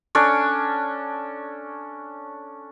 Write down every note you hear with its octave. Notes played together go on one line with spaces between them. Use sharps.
C#4 D4 A4 C#5